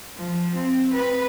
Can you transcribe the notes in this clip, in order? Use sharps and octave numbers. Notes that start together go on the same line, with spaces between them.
F3
C4
B4